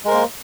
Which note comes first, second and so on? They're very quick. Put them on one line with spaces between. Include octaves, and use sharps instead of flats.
G#3 A#4 C5 A#3